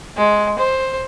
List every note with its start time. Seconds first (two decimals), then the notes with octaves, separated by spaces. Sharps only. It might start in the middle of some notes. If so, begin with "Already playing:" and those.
0.17 G#3
0.59 C5